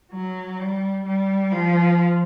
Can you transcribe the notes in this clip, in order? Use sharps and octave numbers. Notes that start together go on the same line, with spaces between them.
F#3
G3
G3
F3